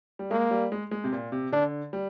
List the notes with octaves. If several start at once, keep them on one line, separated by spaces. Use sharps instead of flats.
G3
G#3 A#3
G3
G#3
G#3
C3
A#2
C3
D3 D4
G3